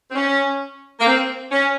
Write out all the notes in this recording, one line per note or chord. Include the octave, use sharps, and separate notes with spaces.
C4
C#4
A#3
C4
C#4